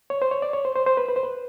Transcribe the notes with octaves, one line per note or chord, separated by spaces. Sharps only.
C#5
C5
C#5
D5
C#5
C5
C5
C5
B4
B4
C5
B4